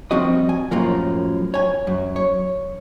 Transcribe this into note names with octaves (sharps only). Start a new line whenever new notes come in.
F3 G3 C4 F#4 D#5
G#5
F#2 A2 F3 A#3
C#5 G#5
F#2
C#5